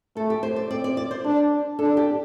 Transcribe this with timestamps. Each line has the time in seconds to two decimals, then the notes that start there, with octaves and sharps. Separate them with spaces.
0.16 A3 A4
0.30 G4
0.43 C5
0.56 D5
0.70 C4 D5
0.84 D5
0.97 D5
1.11 C5
1.25 D4
1.79 D4 A4
1.97 G4